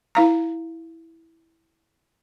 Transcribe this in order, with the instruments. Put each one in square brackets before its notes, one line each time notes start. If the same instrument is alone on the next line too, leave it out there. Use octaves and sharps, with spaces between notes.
[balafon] E4 F5 A#5